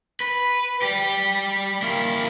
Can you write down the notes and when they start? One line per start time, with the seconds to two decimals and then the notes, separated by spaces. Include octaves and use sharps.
0.20 B4
0.82 G3 G4
1.82 A#3 E4